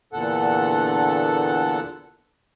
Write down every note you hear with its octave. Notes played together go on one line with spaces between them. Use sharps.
E2 A#2 D3 A4 F#5